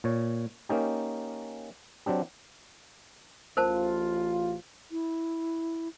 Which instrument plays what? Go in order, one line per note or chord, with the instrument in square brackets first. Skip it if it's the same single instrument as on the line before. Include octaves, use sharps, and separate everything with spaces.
[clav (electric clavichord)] A#2 C#5
A#3 C#4 D#4 G4
F#3 C4 D4 G4
[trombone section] A1 F4 [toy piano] A#4 C5 A5
[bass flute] E4